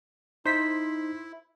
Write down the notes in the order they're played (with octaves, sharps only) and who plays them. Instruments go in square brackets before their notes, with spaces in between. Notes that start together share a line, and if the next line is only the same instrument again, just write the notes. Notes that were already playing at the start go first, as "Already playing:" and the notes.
[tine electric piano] D#4 [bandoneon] E4 [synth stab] C5 B6